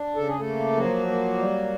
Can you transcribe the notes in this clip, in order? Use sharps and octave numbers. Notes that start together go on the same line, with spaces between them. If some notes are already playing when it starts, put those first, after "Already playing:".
Already playing: D4
C#3 A4
G#4
A3 A4
A#3
F3 F#3 F#4
A#3
G3